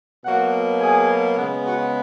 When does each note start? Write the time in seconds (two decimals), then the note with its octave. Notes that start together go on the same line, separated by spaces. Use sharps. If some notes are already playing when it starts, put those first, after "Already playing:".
0.25 B2 F#3 A#3 F#4 F#5
0.80 G#4 G#5
1.37 C#3 G#3 B3
1.65 F#4 F#5